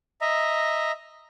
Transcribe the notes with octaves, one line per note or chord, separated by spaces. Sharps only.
D#5 E5 A#5